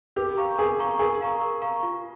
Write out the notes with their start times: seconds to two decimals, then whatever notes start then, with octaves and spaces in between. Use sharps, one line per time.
0.16 G4 A#4
0.37 F5 A#5 C#6
0.58 G#4 A#4
0.79 F5 A#5 C#6
0.99 G#4 A#4
1.21 F5 A#5 C#6
1.41 A#4
1.62 F5 A#5 C#6
1.83 F4